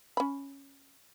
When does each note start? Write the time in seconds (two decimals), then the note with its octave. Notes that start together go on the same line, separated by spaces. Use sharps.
0.17 C#4 B5